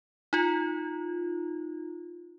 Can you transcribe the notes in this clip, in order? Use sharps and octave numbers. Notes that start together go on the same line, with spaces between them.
D#4 F4